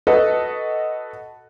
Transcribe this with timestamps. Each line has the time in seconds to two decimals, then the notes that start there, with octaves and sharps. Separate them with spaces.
0.07 F#4 A4 B4 D#5